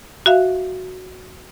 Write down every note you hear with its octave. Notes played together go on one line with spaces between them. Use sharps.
F#4 E5 F5